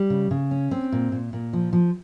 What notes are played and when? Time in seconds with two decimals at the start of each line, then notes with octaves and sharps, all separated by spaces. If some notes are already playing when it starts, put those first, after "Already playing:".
Already playing: G3
0.10 C#3
0.31 C#3
0.51 C#4
0.71 C4
0.92 A#2
1.12 A#2
1.33 A#2
1.53 F3
1.73 F3